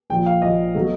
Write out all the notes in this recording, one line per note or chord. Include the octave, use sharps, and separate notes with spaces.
A#1 A#2 F3 G5
F5
A#1 A#2 F3 D#5
B2 F#3 A3